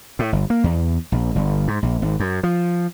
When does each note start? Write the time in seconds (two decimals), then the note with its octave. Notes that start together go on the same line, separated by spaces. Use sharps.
0.19 A2
0.32 G1
0.50 A#3
0.64 E2
1.12 A#1
1.35 G1
1.68 G#2
1.82 A#1
2.02 G#1
2.20 F#2
2.43 F3